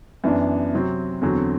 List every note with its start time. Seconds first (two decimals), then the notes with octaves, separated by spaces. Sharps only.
0.24 F#2 E3 B3 D4
0.73 C3 F#3 C4
1.22 E2 D3 F#3 C4